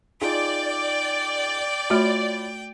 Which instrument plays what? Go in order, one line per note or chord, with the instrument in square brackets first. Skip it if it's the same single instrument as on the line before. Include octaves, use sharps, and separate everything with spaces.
[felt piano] D#4 F4 G#4 [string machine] D5 [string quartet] G5
[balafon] A3 F#4 [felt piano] F4 C#5 B5